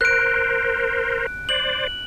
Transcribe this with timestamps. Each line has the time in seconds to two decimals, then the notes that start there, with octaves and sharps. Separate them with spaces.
0.01 A#4 C5 F#6 D7
1.49 C5 D5 F#7